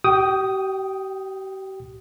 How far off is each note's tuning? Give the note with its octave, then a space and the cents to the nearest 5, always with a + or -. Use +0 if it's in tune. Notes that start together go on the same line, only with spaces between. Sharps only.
G4 -40 G5 +0 D#6 +0